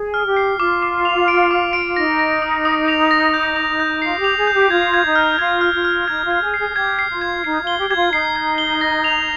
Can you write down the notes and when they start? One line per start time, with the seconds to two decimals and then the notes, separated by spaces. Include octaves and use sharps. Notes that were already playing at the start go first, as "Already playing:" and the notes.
Already playing: G#4
0.14 F6
0.25 G4
0.37 C7
0.59 F4 D6
0.82 D6
1.05 F7
1.28 D7
1.51 D6
1.73 D7
1.96 D#4 A#6
2.19 A#6
2.42 D#6
2.65 D#6
2.88 F7
3.11 A#6
3.34 G6
3.56 F7
3.80 G6
4.02 F4 C7
4.19 G4
4.24 F7
4.37 G#4
4.47 G6
4.54 G4
4.70 F4 G#6
4.94 G#6
5.05 D#4
5.15 F6
5.39 F4 G#6
5.61 F6
5.74 F4
5.85 F6
6.08 D#4 G#6
6.25 F4
6.31 G#6
6.42 G#4
6.54 C7
6.59 G#4
6.69 G#4
6.76 G4 G#6
6.99 C7
7.10 F4
7.21 G#6
7.44 D#4 C7
7.61 F4
7.67 G7
7.78 G4
7.89 G4 G#6
7.96 F4
8.12 D#4 C7
8.36 G#6
8.58 G7
8.81 A#6
9.04 F7